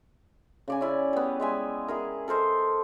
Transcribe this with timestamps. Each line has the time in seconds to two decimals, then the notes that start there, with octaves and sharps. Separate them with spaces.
0.68 C#3 D5 G#5
0.81 C#4 E4 D5 G#5
1.13 G3 B3
1.40 G#3 E5 G#5
1.88 E4 G#4 A#4
2.28 A4 A#4 C5 D#5